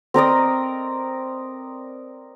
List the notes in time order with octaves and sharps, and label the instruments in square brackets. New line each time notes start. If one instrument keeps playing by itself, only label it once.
[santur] C4 A#4 D5 D#5